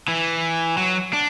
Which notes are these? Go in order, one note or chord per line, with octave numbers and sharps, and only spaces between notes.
E3
F#3
D4